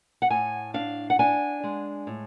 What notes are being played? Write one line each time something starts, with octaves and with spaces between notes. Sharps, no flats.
F#5
A2 G#5
D4 F5
F#5
D4 G#5
G#3
A2